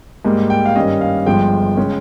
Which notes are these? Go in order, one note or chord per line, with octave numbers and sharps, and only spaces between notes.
G#2 G3 A#3
G5
F5
G2 D#3 G3 C#4 D#5
F5
G1 G2 F3 G#3 G5
C#3 G#3 C#4